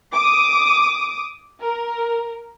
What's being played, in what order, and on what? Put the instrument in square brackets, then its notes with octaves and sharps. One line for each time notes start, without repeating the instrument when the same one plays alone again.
[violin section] D6 D#6
A#4